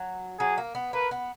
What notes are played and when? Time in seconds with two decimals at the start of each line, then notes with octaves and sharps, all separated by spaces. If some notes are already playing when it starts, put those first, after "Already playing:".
Already playing: F#3
0.39 F#3 G#4
0.58 A#3
0.75 B3
0.93 A#3 B4
1.11 B3